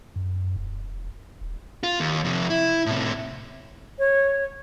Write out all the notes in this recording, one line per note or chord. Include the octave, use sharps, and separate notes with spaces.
F#2
E1
D#1
F4
D#2
F2 C3
E4
A2 C3
C#5